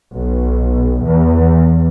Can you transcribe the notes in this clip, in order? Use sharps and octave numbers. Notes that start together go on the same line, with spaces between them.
B1
E2